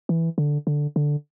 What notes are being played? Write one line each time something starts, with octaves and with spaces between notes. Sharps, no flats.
E3
D3
D3
D3